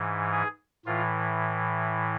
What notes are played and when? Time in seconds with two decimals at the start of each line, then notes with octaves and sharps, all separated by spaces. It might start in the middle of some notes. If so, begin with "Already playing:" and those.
Already playing: G#2 E3
0.32 G#4
0.85 A2 E3 F4